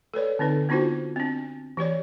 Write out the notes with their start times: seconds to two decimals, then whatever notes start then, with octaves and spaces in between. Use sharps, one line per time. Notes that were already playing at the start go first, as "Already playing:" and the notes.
0.14 A4 B4 C#5 D5
0.39 D3 C4 D#4 B4
0.69 B3 D4 D#4 F4 F#4 C5
1.16 C4 D4
1.77 E3 G4 C#5 D5